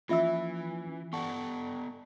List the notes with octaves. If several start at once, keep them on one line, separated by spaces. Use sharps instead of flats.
E3 F3 A#3 C#4 F4 E5 E6
B3 A4 D5 F#5 A5 C#6